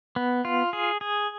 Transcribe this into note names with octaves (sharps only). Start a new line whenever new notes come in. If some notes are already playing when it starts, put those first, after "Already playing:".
B3
F4
G#4
G#4